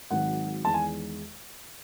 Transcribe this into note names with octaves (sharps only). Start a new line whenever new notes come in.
G#1 G#2 D#3 F#3 F#5
E2 D#3 G#3 A5
G#5